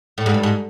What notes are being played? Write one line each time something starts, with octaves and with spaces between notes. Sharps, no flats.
A2
G#2
G2
G#2